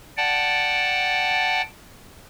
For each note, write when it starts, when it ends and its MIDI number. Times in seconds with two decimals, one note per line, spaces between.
0.17 1.62 74
0.17 1.62 78
0.17 1.62 79
0.17 1.62 81